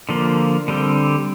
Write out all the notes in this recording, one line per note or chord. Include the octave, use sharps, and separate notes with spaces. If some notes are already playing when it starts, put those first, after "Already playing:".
D3 F3 A#3
D3 G3 C4